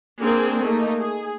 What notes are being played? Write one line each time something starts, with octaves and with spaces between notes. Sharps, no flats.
A#3 C4 D4 G#4 A#4
A3 A#3 D#4
G#4